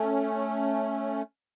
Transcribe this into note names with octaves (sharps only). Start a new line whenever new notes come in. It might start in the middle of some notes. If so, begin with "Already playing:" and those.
Already playing: A3 C#4